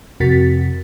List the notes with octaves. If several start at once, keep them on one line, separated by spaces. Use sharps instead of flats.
F2 C3 F#4 A#4 A6 B6